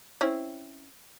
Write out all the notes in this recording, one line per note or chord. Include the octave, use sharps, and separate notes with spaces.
C4 C#4 E4